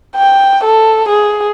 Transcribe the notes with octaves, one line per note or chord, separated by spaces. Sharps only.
G5
A4
G#4